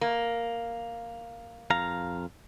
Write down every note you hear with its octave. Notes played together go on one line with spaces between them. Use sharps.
A#3
F2 F5 A#5